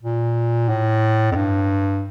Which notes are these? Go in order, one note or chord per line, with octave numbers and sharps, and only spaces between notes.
A#2
A2
F2
G2